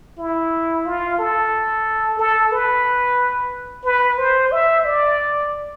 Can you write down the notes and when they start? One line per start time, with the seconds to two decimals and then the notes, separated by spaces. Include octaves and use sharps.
0.18 E4
0.86 F4
1.19 A4
2.19 A4
2.52 B4
3.84 B4
4.18 C5
4.52 E5
4.85 D5